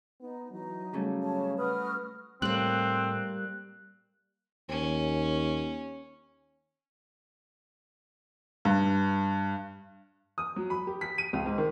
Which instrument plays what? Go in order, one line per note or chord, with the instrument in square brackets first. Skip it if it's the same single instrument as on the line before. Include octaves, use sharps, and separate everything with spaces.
[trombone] B3 [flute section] D#4
[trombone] E3 [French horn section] F#3 [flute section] D#4
[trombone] C#3 [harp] G3 A3 C#4
[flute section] C#5 A5
[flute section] F#4 D#6 F6 [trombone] B4
[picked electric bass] A2 [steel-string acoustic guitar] G3 A#3 [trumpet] C4 [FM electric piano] F#6
[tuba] D#2 [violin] C#4
[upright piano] G2
D#6
F#3
B5
G4
B6
D#7
C#2
G#2
D#3